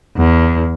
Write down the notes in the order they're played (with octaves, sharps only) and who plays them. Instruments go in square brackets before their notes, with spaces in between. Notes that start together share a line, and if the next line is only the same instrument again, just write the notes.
[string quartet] E2